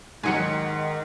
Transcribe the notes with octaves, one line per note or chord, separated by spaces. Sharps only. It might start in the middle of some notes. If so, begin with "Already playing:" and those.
G#2 D#3 F#3 D#4 F#5 G#5 C#7